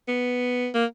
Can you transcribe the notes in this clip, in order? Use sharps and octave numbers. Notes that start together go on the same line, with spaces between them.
B3
A#3